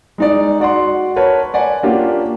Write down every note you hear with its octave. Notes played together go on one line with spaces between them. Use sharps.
G#3 D#4 D5
F#4 D5 F#5 C6
A#4 B4 C#5 A5
D5 F#5 G#5
A#3 C#4 D4 F4 G4